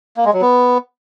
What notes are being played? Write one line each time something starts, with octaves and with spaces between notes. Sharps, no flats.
A#3
G#3
F#3
B3